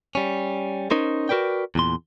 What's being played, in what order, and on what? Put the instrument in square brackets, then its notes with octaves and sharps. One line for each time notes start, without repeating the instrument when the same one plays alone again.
[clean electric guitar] G3 C#4
C#4 D#4 A#4 C5
F#4 A#4 B4 D5 G5
E2 A#2 C6